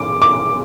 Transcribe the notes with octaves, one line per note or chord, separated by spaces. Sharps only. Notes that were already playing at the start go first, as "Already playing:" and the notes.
Already playing: D6
D6